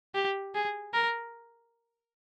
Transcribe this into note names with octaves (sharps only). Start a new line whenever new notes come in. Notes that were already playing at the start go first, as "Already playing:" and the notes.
G4
G#4
A#4